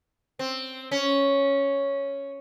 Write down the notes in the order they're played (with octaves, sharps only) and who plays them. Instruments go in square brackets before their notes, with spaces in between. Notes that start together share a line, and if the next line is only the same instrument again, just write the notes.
[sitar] C4
C#4